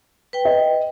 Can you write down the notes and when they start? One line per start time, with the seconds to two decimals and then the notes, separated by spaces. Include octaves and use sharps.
0.33 B4 G5
0.45 D#5